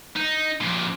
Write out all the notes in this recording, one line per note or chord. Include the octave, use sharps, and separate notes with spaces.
D#4
F2 A#2